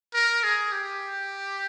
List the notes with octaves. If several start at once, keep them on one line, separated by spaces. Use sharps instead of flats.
A#4
G#4
G4